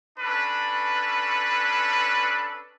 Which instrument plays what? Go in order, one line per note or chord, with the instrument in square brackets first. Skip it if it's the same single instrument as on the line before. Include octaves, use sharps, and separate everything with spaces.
[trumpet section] C#4 D4 A4 B4